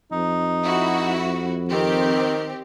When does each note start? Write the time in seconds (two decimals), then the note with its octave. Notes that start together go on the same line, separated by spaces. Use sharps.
0.12 F2 D#4
0.64 E4 F#4
1.69 D#3 C4 G4